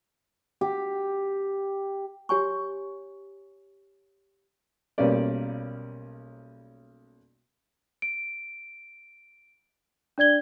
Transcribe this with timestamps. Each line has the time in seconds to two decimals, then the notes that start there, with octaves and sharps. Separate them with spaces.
0.61 G4
2.29 G4 C#5 G#5 C#6
4.98 B1 G3 A#3 C#4 B4 D5
8.02 D7
10.18 D4 D5 G#6 G7